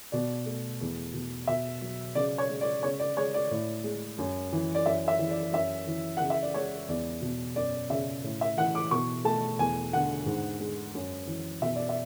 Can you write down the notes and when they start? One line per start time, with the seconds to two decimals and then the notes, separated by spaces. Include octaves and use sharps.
0.12 B2 D5
0.46 A3
0.81 E2
1.14 B2
1.48 B2 E5
1.82 F#3
2.15 C#3 D5
2.38 C#5
2.50 G#3
2.61 D5
2.83 C#3 C#5
2.99 D5
3.17 G#3 C#5
3.34 D5
3.51 A2
3.84 G#3
4.18 F#2
4.52 E3
4.75 D5
4.86 F#2 E5
5.08 E5
5.19 E3
5.31 D5
5.53 F#2 E5
5.87 E3
6.17 C#3 F#5
6.30 E5
6.42 D5
6.54 G#3 C#5
6.88 E2 D5
7.22 B2
7.56 F#2 D5
7.90 C#3 E5
8.24 A2
8.41 E5
8.58 E3 F#5
8.75 D6
8.91 B2 C#6
9.25 A3 A5
9.59 E2 G#5
9.93 D3 F#5
10.26 G#2
10.60 G#3
10.95 F#2
11.27 E3
11.62 B2 E5
11.76 D5
11.89 E5